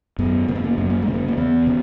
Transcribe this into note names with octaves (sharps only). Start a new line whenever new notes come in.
F#2 B3
C#3 A#3
B3
A#3
F#2 B3
A#3
G#3
C#3
A#3
A#3
E2 B3
C#3